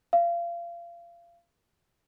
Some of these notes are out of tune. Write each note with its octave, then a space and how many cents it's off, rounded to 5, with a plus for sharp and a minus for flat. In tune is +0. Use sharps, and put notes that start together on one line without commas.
F5 -30